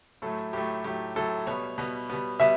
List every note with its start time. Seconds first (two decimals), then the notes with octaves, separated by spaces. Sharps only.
0.22 A2 F#3 A3 A4
0.53 A2 F#3 A3 G4
0.84 A2 F#3 A3 G4
1.16 A2 F#3 A3 A4
1.47 B2 G3 B3 C#5
1.78 B2 G3 B3
2.10 B2 G3 B3
2.40 B2 G3 B3 E5